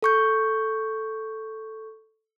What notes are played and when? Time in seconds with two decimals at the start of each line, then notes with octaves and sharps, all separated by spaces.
0.02 A4 C#6 G6